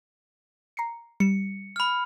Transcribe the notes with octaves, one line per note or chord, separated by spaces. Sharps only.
A#5 C7 C#7
G3 C#7 E7
B5 F6